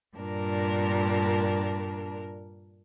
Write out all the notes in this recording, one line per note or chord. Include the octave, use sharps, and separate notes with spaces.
G2 A#2 D4 A#4